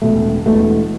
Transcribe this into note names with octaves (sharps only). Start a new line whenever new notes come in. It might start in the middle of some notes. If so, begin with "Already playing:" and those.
E2 B2 A3
E1
E1 E2 B2 A3